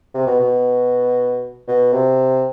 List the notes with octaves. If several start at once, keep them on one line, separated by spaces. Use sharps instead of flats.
C3
B2
B2
B2
C3